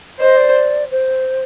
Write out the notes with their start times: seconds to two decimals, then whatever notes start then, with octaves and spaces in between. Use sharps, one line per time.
0.20 C5 D#5
0.37 D5
0.91 C5